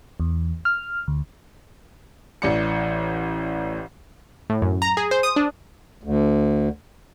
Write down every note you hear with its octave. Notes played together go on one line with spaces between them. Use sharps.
E2
F6
D2
A1 A2 D5 C#7
A2
F#2
A#5
G#4
C5
D#6
D4
D2